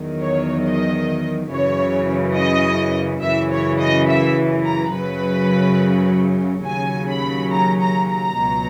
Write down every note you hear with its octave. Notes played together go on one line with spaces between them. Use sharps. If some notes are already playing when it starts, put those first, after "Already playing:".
Already playing: E2 D#3 F#3
C#5
D#5
F#2 C#3 E3 C#5
D#5
F#2 C#3 E3 E5
C#5
D#5
E5
A#5
F#2 C#3 F#3 B4
D#2 C#3 F#3 G#5
B5
A#5
A#5
A#5
C#2 B2 F#3